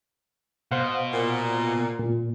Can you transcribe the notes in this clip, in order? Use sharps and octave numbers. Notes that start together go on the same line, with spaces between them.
B2 C5 F5 F#5
A#2
A#2